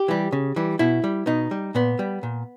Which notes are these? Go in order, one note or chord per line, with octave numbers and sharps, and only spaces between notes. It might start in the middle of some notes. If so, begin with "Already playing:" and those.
Already playing: G4
E3 G3
C#3
E3 G3
B2 E4
G3
B2 D#4
G3
A#2 B3
G3
A#2